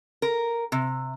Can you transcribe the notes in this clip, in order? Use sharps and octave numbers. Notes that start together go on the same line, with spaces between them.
A#4
C3